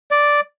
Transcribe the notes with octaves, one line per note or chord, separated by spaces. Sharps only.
D5